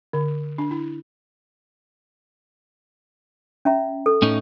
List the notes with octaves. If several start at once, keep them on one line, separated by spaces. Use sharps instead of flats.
D3
D4
E4
C#4 E5 A#5
A4
A2 C#4 D#4